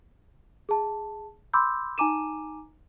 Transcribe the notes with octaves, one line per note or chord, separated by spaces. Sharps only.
G#4 A5
B5 C6 D6 E6 G6
D#4 G#5 A#5 D6 D#7 E7